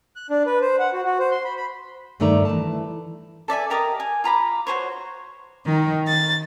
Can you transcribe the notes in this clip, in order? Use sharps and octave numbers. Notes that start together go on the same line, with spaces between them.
F#6
D4
B4
C5
F#5
F#4
F#4
C5
C6
B5
B5
G2 D#3 A3 D#4 D5 A#5
E3 A5
A4 D5 E5 G#5
G4 A#4 D#5 D6
G#5
F4 A#5 B5 D6
F#4 G#4 C5 C#5
D#3
A6